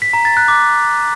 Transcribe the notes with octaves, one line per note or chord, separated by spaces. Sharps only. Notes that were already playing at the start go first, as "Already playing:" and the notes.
B6
A#5
A6
F#6
D6